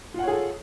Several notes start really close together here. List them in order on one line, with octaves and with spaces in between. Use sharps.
F4 F#5 C#5 G#4 A4